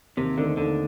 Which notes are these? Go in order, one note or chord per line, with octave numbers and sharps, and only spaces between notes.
D#2 C3
D3 D#3 A3 C4 D#4
D#2 D3